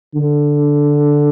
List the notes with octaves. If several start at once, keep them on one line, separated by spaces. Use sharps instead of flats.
D3